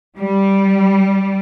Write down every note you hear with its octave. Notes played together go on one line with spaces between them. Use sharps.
G3